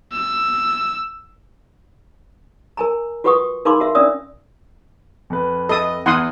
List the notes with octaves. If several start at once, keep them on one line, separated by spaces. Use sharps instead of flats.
E6
A#4 G#5 A#5
F4 F#4 B4 F#5 C#6 D#6
D#4 A#4 F5 B5 C6 D6
F#4 A#4 E5 F5
C#4 D4 D5 E5 D#6 E6
F2 B4
A4 D#5 D#6
E2 F#5 C6 D#6